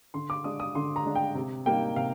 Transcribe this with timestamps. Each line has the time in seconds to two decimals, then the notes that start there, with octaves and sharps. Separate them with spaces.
0.14 D3 C6
0.30 D6
0.44 G#3 D4 D#6
0.60 D#6
0.75 D3 C6
0.96 A#5
1.05 G#3 D4
1.15 G5
1.35 C3
1.66 G3 A#3 D#4 G5
1.96 C3 F5